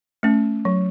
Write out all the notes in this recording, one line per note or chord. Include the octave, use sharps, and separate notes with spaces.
A3 C#4
F#3